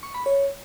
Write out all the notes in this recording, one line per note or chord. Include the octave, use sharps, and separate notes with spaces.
C#6
B5
C#5